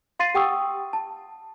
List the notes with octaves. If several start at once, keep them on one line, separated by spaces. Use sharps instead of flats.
F5 C6 A6 C7 D#7
G4 F#5 G5 C#6 D#6 E6
A5